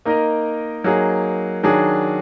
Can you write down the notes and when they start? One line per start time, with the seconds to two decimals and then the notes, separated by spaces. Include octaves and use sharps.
0.05 A#3 D#4 A#4 D#5
0.84 F#3 A#3 D#4 G#4
1.63 D#3 F#3 D4 G#4